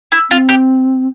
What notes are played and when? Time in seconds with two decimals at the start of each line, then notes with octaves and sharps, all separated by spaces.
0.12 E4
0.30 C4 F4
0.49 G4